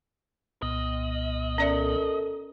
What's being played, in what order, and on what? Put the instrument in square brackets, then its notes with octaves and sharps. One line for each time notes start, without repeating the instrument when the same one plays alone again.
[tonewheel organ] C2 A#2 B3 [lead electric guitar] D#5
[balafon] C#4 D5 E5 [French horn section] A4 A#4